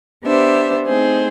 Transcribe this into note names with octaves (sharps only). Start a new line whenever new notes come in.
B3 D4 G4 C5 E5
A3 C4 D#4 G#4 C5